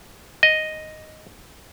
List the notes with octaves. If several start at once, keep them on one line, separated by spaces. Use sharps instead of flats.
D#5